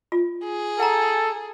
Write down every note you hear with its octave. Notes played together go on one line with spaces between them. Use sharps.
F4
G#4
A4 F#5 A#5